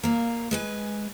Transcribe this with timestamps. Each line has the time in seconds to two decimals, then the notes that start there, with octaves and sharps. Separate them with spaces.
0.03 A#2 A#3
0.51 G#3 B4 G#5